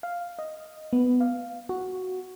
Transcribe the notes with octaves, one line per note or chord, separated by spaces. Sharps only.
F5
D#5
B3
F5
F#4